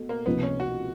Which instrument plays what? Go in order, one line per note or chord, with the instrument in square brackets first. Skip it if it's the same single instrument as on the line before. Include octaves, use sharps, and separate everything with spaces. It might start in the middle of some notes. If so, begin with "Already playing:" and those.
Already playing: [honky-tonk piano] B2 A3
[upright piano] A#3
[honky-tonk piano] C#2 C3 F3 A#3 D#4 [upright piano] B3
[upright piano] C#4
F#4